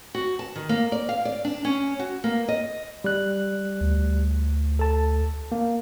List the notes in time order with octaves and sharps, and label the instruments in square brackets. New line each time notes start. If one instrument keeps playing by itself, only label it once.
[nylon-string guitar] F#4
A5
D#3
A#3
D5
F5
D5
D4
C#4
F#4
A#3
D#5
[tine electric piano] G3 F#6
[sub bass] D2
[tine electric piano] A4 A5
A#3